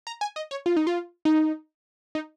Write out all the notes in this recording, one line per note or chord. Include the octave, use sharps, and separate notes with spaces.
A#5
G#5
D#5
C#5
F4
D#4
F4
D#4
D#4